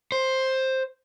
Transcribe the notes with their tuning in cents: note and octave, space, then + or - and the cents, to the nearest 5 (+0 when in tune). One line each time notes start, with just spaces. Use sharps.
C5 +5